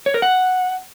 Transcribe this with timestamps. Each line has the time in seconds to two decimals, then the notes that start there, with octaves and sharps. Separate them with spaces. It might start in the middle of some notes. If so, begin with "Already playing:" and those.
0.06 C#5
0.14 A#4
0.22 F#5